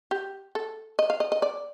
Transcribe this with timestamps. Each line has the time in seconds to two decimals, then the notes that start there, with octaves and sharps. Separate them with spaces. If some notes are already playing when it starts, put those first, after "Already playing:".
0.11 G4
0.55 A4
0.99 D#5
1.10 F5
1.20 D#5
1.32 D#5
1.42 D5